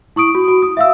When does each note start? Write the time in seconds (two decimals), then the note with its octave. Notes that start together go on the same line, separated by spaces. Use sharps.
0.16 E4 C#6 D#6 D7
0.35 F#4
0.48 F#4
0.62 D#6
0.77 E5 F5 E6